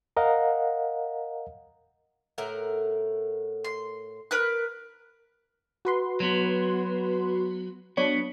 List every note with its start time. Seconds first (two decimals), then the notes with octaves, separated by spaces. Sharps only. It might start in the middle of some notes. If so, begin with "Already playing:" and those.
0.17 A#4 D#5 F5 F#5 A#5
2.38 A2 A#4 F#5
3.64 C6
4.31 A#4 B4 F#6
5.85 F#4 B4 C6
6.20 F#3 B3
7.97 F#3 B3 D4 C#5